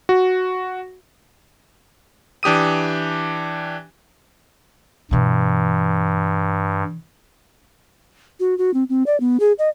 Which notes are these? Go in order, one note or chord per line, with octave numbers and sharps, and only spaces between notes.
F#4
E3 D4 G4 D#6 D#7
G2 B2 E3
F#4
F#4
C4
C4
D5
B3
G#4
D#5